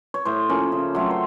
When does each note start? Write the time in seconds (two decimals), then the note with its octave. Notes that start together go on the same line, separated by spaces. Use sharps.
0.14 C#5
0.25 A2 C5
0.50 F3 A#3 C#4
0.72 C#3
0.95 F#3 A3 C4
1.11 C5